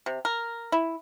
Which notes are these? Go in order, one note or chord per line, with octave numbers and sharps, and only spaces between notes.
C3
A#4
E4